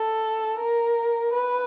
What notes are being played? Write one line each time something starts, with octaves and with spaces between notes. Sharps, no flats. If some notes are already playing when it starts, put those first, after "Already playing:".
Already playing: A4
A#4
B4